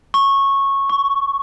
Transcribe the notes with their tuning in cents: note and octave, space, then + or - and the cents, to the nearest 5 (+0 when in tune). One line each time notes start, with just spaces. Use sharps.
C#6 -15
C#6 +15